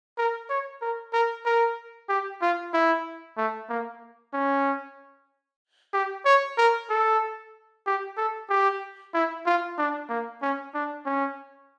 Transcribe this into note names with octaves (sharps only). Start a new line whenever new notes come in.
A#4
C#5
A#4
A#4
A#4
G4
F4
E4
A3
A#3
C#4
G4
C#5
A#4
A4
G4
A4
G4
E4
F4
D4
A#3
C#4
D4
C#4